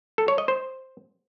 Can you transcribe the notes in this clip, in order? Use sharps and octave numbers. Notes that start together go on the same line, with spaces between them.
A4
C#5
D#5
C5